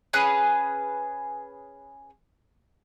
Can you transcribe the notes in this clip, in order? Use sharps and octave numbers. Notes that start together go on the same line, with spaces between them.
C#4 G#4 B4 F#6